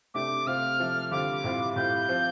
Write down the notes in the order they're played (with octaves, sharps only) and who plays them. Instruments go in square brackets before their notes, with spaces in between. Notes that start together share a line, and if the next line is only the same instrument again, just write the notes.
[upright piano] C3 A3 D4 G4 [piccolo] D6
[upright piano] C3 A3 C4 F4 [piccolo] F6
[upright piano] C3 F3 A3
[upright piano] D3 G3 C4 F4 [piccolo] D6
[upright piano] A2 G3 C4 F4
[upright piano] A2 G3 F4 [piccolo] G6
[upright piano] F3 C4 F4